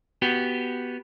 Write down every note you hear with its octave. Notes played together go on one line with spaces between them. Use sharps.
B3 F#4 G4